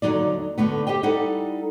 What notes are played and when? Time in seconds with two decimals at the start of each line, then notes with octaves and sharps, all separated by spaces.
0.02 D#2 D3 F#3 D#4 D5
0.58 D2 D3 A3 B3
0.87 G4 C5 D#5 G5
1.03 G3 D#4 E4 A4 F#5